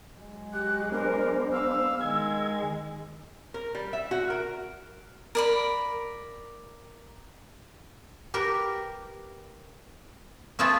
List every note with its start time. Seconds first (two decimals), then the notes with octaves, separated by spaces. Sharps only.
0.16 F#3 G#3
0.53 G4 F#6
0.92 B3 D4 A#4 C5
1.52 F5 E6
2.01 D#3 G#3 G#6
3.54 A#4
3.75 G3
3.93 E5
4.11 F#4
4.30 A#4
5.35 A#4 D5 B5
8.34 G4 A#4 B4
10.59 A3 C4 F4 G#4 A4 B4